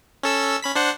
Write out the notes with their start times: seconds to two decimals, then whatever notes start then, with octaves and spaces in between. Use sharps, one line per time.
0.23 C#4 A4 E6
0.62 C#4 B5 B6
0.75 D4 C5 F#5